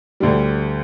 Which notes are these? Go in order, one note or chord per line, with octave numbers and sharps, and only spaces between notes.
D2 D3 G3